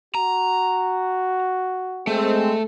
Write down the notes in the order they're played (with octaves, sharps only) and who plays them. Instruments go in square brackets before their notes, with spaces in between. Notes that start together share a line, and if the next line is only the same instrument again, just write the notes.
[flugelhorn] F#4 [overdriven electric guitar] A#5
[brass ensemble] G#3 C4 [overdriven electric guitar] A3